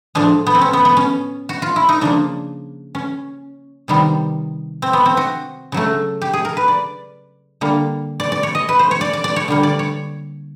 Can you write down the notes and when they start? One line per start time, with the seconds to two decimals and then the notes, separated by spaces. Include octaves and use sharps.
0.15 A2 F3 G#3 D4
0.47 B3
0.55 C4
0.61 C#4
0.73 B3
0.85 B3
0.97 C#4
1.49 F#4
1.62 F4
1.76 E4
1.89 D#4
2.01 C#3 F3 A#3 D4
2.95 C#4
3.88 C3 D#3 G3 B3
4.82 C4
4.93 B3
5.06 C4
5.17 F#4
5.72 C#3 F#3 A3
6.22 G4
6.33 G#4
6.45 A#4
6.57 B4
6.68 D5
7.61 D3 G3 A#3
8.20 D5
8.32 D5
8.43 C#5
8.55 D#5
8.69 B4
8.79 C5
8.91 C#5
9.01 D5
9.13 D5
9.24 D5
9.36 C#5
9.48 D3 G3 A#3
9.63 D5
9.79 C#5